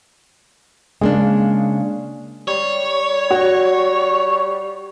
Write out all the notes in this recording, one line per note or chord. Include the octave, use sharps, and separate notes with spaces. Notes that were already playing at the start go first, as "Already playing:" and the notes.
C#3 G#3 A#3 D4
G3 C#5
F#4